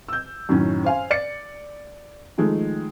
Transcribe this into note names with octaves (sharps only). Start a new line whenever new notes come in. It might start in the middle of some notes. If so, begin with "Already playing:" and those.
E6 G6
F#2 A2 D#3 C#4
C5 F5 G#5
D5 A6 C#7
D#3 F3 G#3 A3